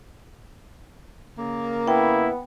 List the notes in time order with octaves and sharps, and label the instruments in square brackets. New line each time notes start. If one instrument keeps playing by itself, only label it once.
[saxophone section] C#3 A#3
[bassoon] B3 [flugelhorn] E4 [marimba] G5